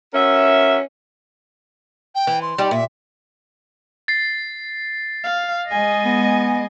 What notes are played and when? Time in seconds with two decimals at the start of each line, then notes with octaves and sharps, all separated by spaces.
0.14 C#4 F#4 A#4 E5
2.15 G5
2.27 E3
2.42 C6
2.58 G3 D#4 G4
2.71 A#2 E5
4.08 A6 C7
5.24 F5
5.71 G#3 D#5 G#5
6.05 B3